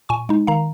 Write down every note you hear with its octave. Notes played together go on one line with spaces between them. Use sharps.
A#2 G#5 C#6
G#3 D#4
D#3 F5 A#5